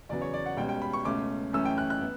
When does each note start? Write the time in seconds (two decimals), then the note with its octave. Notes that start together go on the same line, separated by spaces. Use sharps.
0.09 E2 C#3 F#3 B3 D5
0.22 C#5
0.34 D5
0.46 F#5
0.57 C#2 B2 G3 C#4 G5
0.69 G5
0.82 B5
0.93 C#6
1.05 C#2 B2 A3 C#4 D6
1.53 F#2 E3 A3 C#4 E6
1.65 G5
1.78 F#6
1.90 F#6
2.01 B3